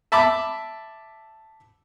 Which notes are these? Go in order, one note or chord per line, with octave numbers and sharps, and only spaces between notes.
E5 A5 B5 D6